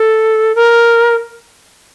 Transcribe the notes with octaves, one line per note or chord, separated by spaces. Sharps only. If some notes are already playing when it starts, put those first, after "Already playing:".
Already playing: A4
A#4